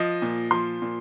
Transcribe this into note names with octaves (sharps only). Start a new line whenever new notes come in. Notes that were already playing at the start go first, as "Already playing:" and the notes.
Already playing: F3 D#5
A#2
F3 C6
A#2